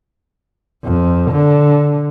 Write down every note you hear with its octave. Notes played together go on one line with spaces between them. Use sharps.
F2
D3